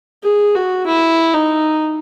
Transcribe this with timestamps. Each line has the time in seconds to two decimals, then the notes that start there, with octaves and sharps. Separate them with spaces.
0.23 G#4
0.55 F#4
0.86 E4
1.34 D#4